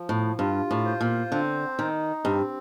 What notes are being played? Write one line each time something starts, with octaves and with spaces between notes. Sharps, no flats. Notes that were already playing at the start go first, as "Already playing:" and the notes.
Already playing: F3
A2
G2 F4
A2
C5
A#2
D3 C4
D#3 D#4
G2 C4